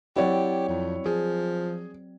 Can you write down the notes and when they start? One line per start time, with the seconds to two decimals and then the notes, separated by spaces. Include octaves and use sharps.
0.16 F#3 C4 E4 G4 C#5 D5 F#5
0.68 F2
1.06 F3 G#4